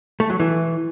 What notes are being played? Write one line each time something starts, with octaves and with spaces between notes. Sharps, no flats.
A3
F#3
E3